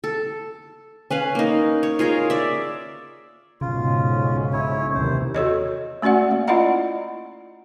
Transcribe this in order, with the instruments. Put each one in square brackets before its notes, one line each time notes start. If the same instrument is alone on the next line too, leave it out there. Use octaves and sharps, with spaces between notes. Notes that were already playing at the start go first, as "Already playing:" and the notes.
[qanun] A4
C#4 B4 F5
A#3 D#4
C#5
F4 G#4 A#4 C#5
D5 E5
[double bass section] B1 G#2 C#4 [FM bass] C#3 [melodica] F4
[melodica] E4 C#5
[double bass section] D#2 C3 E3 [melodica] C5
[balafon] F#4 A4 C#5 D#5
A3 C#4 F#4 D5 F#5
A#3
E4 F4 D5 D#5 F#5 A#5